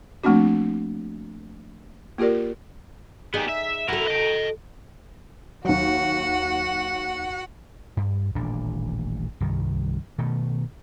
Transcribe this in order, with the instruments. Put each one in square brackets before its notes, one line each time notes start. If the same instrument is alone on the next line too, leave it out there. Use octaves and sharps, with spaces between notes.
[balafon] F3 A3 A#3 C4 D4 F#4
A#3 F4 G4 A#4 D5
[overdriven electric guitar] B3 G4 [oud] D#4 G#4
[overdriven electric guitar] E5
[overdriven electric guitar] E4 A#4 [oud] F#4 A4
[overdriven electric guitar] D#5 G5
[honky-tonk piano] D#2 F#3 [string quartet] F#4 F#5
[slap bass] G2
D#1 A1 A#2 D4
C2 G2 D#3
B2 D#3 A3